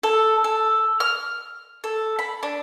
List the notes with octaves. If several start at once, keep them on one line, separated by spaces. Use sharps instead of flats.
A4
A4
F6
A4
B5
D4